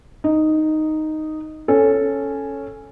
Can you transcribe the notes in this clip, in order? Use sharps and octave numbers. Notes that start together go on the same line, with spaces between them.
D#4
C#4 A4